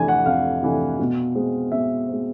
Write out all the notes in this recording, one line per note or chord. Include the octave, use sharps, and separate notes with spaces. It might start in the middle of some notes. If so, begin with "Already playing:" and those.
Already playing: F2 C3 E3 A3 D4 G#5
F#5
F2 F5
C3 E3 A3 D4
B2
G#3 C4
B2 E5
G#3 C4